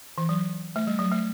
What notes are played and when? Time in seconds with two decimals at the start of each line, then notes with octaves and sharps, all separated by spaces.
0.18 E3
0.29 F#3
0.76 A3
0.87 G3
0.99 F#3
1.12 A3